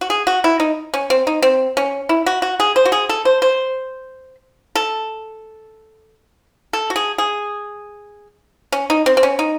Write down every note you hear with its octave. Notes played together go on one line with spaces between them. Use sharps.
F#4
G#4
F#4
E4
D#4
C#4
C4
D#4
C4
C#4
E4
F#4
F#4
G#4
C5
F#4
G#4
A4
C5
C5
A4
A4
F#4
G#4
G#4
C#4
D#4
C4
C4
C#4
D#4